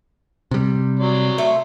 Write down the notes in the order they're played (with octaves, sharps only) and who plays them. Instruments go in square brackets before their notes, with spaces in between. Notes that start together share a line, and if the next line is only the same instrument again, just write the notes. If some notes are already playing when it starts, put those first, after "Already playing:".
[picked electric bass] C3 G3
[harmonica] F#3 D5 C6
[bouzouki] A3